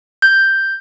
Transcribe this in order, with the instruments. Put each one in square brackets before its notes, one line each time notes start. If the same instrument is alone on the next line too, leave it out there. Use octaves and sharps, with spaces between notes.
[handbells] G6